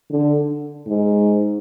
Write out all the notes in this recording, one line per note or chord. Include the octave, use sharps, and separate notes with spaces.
D3
G#2